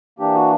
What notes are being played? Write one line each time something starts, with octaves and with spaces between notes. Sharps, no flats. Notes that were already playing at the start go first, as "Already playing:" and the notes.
E3 A#3 D4 G4
F#4